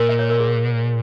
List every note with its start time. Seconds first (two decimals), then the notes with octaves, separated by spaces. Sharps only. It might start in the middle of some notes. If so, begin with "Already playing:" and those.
Already playing: A#2 A#4
0.09 D#5
0.19 C#5
0.30 A#4
0.40 G#4